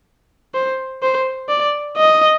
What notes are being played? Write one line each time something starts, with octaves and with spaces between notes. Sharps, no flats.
C5
C5
D5
D#5